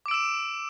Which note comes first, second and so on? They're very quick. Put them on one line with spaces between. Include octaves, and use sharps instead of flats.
D6 D7 E6 E7